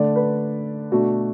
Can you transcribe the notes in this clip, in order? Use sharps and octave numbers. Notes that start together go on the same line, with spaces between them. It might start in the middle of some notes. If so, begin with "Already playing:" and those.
Already playing: D3 A3 D4 D5
B4
B2 A3 D4 F#4